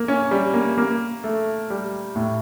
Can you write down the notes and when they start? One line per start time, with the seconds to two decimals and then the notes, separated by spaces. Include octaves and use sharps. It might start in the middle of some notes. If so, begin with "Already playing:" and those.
Already playing: A#3
0.08 C#4
0.31 G3
0.54 A#3
0.77 A#3
1.24 A3
1.70 G3
2.16 A2